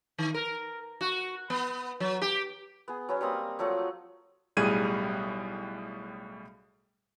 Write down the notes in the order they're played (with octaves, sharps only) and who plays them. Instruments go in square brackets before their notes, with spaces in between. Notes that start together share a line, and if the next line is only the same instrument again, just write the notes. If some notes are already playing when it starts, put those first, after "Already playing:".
[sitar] D#3
A#4
F#4
B3
F#3
G4
[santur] B3 G#4
F#3 B3 C#4
G3 A#3 C4 D#6
F3 F#3 A3 F#5
[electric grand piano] B1 A2 G3 G#4 G#6 D#7